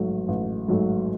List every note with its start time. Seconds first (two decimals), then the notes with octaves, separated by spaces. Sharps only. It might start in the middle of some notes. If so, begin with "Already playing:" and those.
Already playing: A1 G#2 F#3 A3
0.28 A1
0.68 G#2 F#3 A3